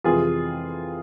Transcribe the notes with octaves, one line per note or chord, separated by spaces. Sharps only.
F2 C3 E3 F4 G#4